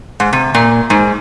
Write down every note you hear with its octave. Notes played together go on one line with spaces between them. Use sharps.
G#2
C3
A#2
G#2